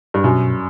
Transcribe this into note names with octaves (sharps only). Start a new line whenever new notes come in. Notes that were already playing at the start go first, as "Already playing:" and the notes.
G2
F#2 B2